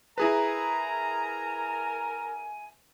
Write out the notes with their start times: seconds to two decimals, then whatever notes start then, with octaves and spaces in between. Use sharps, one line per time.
0.18 E4 G#4 A#4 B4 G#5 A#5